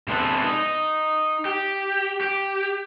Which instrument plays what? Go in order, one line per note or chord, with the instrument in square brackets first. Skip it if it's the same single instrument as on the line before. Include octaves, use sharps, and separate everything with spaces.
[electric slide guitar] C3 G#3 B3 D4 A4 B4
D#4
G4
G4